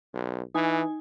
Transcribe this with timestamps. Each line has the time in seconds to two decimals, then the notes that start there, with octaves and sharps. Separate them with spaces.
0.14 B1
0.55 E3 D#4 G#5